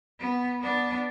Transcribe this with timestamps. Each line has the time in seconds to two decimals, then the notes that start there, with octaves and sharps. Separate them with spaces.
0.20 B3
0.60 B3 D4